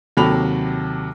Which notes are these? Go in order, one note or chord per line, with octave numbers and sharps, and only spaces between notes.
D#2 C3 F#3 A4 B5 F7